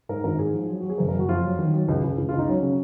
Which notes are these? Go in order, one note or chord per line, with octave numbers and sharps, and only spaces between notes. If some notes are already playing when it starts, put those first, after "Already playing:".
G#2 A#4
G#1 A#4
G#2 G#4
F3
F#3
F#3 F#4
G#4
F#1 A#4
A#4
F#1
F#4
F2 F4
F#3
D#3
F#3
C#2
C#2
C#2
F4
C#2
D#4
F#3 C#4
C#3